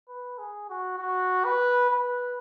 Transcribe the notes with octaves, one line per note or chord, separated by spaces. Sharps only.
B4
G#4
F#4
F#4
B4
B4